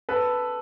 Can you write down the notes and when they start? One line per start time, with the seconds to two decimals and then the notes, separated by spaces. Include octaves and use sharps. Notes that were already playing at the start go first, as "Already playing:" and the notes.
0.09 A4 B4